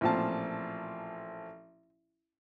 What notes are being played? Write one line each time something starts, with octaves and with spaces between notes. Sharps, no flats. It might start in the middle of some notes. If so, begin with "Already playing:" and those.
A1 A#2 F3 C4 A5